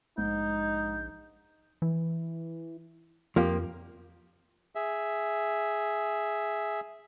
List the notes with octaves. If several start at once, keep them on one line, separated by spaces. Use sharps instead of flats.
A#1 G#2 D#4 G6
E3
F2 F3 A#3 G4
G#4 E5